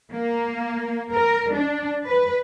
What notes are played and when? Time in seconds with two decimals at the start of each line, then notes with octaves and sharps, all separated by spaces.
0.11 A#3
1.13 A#4
1.53 D4
2.07 B4